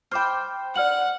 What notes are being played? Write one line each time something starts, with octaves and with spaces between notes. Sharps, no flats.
C5 G5 B5 D6 F6
D5 F#5 F6 F#7